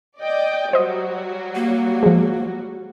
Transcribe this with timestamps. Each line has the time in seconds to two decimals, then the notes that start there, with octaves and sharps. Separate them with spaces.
0.19 D5 D#5 G5
0.73 F#3 G3 F#4 C5 D#5
1.55 A#3
2.03 F3 G#3